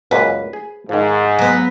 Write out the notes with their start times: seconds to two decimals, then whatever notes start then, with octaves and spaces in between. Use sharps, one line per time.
0.11 C#2 F#2 A#2 B4
0.53 G#4
0.89 G#2 D#3 F3
1.39 F#3 B3 D#5